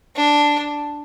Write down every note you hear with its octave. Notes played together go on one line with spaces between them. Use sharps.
D4